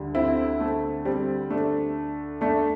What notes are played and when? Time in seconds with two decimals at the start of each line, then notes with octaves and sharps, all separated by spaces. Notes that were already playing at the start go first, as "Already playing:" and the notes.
Already playing: D2 D3 G3
0.15 C4 E4
0.60 A3
1.05 G3 C4
1.50 A3 D4
2.41 A3 D4